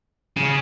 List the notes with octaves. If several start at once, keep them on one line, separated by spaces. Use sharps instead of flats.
C#3